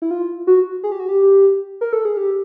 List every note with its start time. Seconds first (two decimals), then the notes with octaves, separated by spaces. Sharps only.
0.02 E4
0.11 F4
0.47 F#4
0.84 G#4
0.92 G4
1.00 F#4
1.09 G4
1.81 A#4
1.93 A4
2.05 G#4
2.17 G4